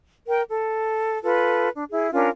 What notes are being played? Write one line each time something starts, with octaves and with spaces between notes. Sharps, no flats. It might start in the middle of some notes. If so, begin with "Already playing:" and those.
A#4 G5
A4
F4 A4 B4
D4
E4 G#4
C#4 D4 F4 A#4